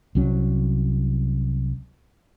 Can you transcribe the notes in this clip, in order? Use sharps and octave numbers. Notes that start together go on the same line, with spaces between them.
C2 F#3 C#4